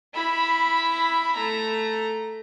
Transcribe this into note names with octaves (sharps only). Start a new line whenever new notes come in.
E4 B5
A3 A#5